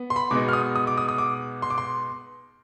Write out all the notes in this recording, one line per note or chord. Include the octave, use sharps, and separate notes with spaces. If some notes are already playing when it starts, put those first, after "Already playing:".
Already playing: B3
C6
B5
B2 G#3 B3 D#4 D6
F6
D#6
D#6
D6
D#6
D#6
D6
C6
D6
C6